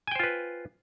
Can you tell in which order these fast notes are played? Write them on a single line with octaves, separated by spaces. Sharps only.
G#5 G5 C5 F4 B4